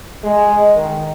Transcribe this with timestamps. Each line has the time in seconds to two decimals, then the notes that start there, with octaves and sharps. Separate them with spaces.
0.23 G#3
0.75 D#3